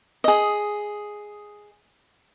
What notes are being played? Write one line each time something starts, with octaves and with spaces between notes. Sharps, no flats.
G#4 D#5